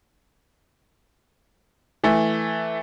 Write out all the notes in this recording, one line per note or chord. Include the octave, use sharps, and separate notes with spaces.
E3 A3